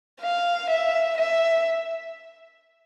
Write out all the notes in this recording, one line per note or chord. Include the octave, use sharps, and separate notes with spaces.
F5
E5
E5